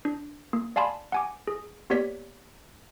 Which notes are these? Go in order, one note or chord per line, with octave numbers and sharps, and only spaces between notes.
D4
A#3
D5 F5 G#5 A5 B5 C6
F#5 G#5 D6
G#4
A#3 B3 G4 C#5 D5 B6